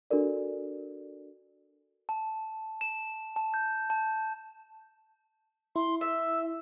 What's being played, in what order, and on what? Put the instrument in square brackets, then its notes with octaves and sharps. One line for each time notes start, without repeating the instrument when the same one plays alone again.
[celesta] D4 F#4 A4 A#4 D5
[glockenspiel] A5
E7
A5
G6
A5
[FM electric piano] E4 [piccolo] C6
[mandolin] E5 [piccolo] E6